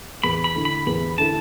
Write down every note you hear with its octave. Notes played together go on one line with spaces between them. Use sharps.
E2 B5
B5
D3 A3 E4
B5
E2 B5
D3 A3 E4 A5